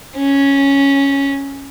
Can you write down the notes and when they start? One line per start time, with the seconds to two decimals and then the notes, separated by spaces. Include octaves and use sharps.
0.16 C#4